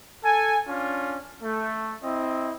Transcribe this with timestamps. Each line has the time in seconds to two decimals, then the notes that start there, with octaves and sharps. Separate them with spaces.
0.24 A4 G#5
0.68 C#4 D4 F4
1.43 A3
2.04 C4 E4 D#5